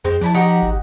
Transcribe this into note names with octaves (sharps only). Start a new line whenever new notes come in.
F2 G#3 C4
F3 D4 E4 A5
D#4 F#4 G4
G#1